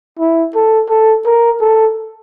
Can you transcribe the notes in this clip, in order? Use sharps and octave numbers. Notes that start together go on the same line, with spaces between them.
E4
A4
A4
A#4
A4